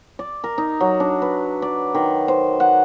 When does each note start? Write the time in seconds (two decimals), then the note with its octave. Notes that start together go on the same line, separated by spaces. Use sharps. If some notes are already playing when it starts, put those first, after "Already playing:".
0.19 D5
0.44 A#4
0.58 D#4
0.81 F#3
1.00 D4
1.22 B4
1.62 D5
1.95 D#3
2.28 C5
2.60 F#5